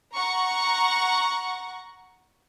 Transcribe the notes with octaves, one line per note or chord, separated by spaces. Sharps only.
F#5 A#5 C#6